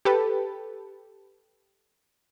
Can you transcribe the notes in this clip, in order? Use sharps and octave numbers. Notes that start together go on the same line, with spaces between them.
G4 A4 B4